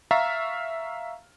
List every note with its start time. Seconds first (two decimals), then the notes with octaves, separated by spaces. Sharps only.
0.11 E5 F5 A#5 C#6 F6 A6